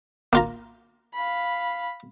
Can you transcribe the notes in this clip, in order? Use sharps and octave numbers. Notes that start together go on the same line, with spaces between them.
A#3 F4 A#5
F5 B5